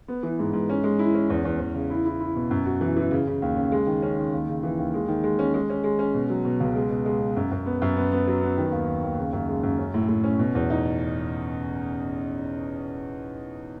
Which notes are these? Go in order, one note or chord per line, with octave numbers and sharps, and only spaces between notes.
B3
E3
G#2
G#2
C#4
G#3
E4
C#4
E2
E2
E2
C#3
E4
E4
E4
B2
F#2
F#4
E3
E3
C#3
C#3
D#2
C#3
G#3
D#3
C#4
D#3
D#2
C#3
E3
D#2
G#3
D#3
G#3
C#4
G#3
C#4
G#3
C#4
B2
F#3
B2
C#2
G#3
B2
G#3
B2
F#2
F#2
B3
F#2
B3
B3
F#3
B3
D#3
D#2
D#2
D#2
C#3
F#2
G#3
F#2
C#4
A2
A2
C#4
B2
E2
D#4